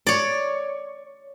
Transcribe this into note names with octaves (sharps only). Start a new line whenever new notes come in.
C#5 D5